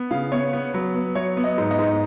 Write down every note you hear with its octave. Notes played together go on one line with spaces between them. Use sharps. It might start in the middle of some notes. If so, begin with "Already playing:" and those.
Already playing: B3
C#3 F5
B3 C#5
B3
F#3 B4
B3
F#3 C#5
B3
D#5
G#2
D#5
G#2